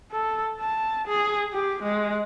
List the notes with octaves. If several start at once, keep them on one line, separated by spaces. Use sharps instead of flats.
A4
A5
G#4
G4
G#3